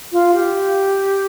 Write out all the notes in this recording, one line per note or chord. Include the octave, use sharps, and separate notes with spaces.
F4
G4